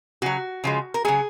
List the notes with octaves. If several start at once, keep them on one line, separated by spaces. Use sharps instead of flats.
C#3 F#3 F#4
C#3 F3 G#3
A#4
C#3 F#3 G#4